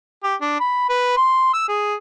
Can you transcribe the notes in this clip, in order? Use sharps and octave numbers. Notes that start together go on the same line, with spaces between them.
G4
D4
B5
B4
C6
E6
G#4